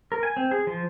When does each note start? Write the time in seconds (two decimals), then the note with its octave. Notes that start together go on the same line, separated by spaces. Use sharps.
0.12 A#4
0.23 G#5
0.37 C4
0.51 G#4
0.67 F3